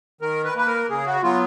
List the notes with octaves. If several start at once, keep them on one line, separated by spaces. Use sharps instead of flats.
D#3 A#4
B4
A#3 B4
A#4
C#3 G#4
F#4
F#3 B3 F4